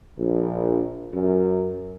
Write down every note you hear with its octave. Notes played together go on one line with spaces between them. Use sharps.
A#1
F#2